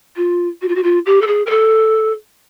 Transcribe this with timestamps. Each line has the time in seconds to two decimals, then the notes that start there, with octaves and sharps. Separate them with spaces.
0.16 F4
0.62 F#4
0.68 F4
0.75 F#4
0.83 F4
1.06 G4
1.21 A4
1.27 G#4
1.46 A#4
1.50 A4